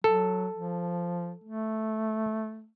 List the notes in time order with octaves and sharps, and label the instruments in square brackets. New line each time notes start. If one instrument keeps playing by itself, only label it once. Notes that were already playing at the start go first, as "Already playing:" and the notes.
[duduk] F#3 [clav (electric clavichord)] A4
[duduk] F3
A3